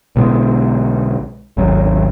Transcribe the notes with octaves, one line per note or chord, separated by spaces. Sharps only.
B1 B2 D3 G#3
G#1 D#2 F#3 C#4